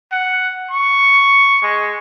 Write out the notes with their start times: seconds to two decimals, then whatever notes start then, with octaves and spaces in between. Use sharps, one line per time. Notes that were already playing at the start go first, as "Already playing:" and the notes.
0.12 F#5
0.71 C#6
1.62 G#3